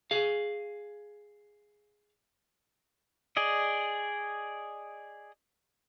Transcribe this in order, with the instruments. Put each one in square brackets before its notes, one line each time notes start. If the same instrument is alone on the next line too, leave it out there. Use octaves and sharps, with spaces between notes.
[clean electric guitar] G#4 F5
[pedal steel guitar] G#4 D5 D#5